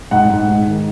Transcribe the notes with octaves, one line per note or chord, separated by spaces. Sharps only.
G#2 F#5
G#2
G#2
D#3